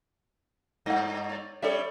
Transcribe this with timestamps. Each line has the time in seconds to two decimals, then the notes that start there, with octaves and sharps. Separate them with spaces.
0.86 G2 D#5 F#5
1.30 C#5 D5
1.62 G3 C#4 A4 C#5 D5 E5